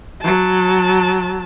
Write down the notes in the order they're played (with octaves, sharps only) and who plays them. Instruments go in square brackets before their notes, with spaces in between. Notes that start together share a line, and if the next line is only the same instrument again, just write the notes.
[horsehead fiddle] F#3 A5